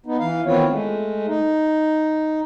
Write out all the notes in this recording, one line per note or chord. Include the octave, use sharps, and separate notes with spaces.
B3 D#4
E3 F5
D#3 E3 B3 C4 F4 C#5
G#3 A3
D#4